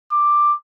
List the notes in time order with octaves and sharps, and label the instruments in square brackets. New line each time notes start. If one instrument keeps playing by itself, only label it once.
[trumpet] D6